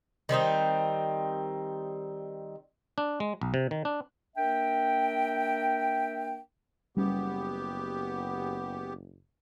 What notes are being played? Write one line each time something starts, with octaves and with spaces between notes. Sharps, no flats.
D#3 G3 C4 D#4
D4
G#3
B1
C3
D#3
D4
A#3 D4 A#4 E5 G5
F#1 G3 B3 C#4 G4